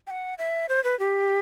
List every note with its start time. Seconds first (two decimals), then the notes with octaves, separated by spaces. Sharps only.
0.07 G5
0.11 F#5
0.38 E5
0.69 C5
0.84 B4
1.00 G4